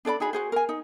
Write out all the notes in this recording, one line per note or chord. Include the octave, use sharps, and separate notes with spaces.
D4 A4 D5 B5
D#4 F#4 G#4 B5
F#4 G#4 C5
A#4 G#5
D#4